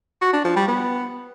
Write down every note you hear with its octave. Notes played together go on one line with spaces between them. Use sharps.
F#4
D4
F3
G3
B3